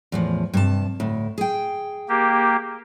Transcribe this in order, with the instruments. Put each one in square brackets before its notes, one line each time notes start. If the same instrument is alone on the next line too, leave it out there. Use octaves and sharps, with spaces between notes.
[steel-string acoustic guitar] E2 A2 F3
G2 C3 A5
D2 A2
G#4 G5
[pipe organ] A#3 G4